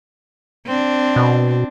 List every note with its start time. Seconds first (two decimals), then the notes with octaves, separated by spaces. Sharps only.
0.66 C4 D4
1.16 B2